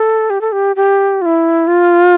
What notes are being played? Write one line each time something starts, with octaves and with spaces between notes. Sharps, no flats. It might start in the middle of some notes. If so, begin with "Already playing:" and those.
Already playing: A4
G4
A4
G4
G4
F4
E4
F4